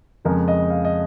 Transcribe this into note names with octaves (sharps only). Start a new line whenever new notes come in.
F2 C#3 G#3 A#4
D#5
F5
D#5